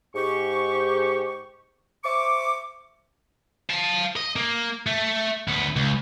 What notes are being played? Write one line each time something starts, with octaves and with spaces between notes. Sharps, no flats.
G#2 G4 C#6
C5 E5 C#6 D6
F5 A5
D#5
A#3
A3
D2 B3
C#2